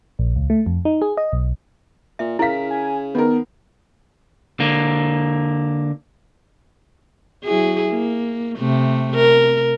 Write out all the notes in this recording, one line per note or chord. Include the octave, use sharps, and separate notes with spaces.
A#1
C#2
A3
F2
D#4
G#4
D#5
B1
A#2 E5
C#3 E4 A#4 F5 B6
G#5
D#3 B3 A#4
D3 A#3
F#3 E4 G#4
A#3
C3 A3
A#4